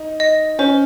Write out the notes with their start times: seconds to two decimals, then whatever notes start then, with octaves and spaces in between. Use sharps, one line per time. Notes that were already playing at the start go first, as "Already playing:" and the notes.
Already playing: D#4
0.20 D#5
0.59 C#4 C5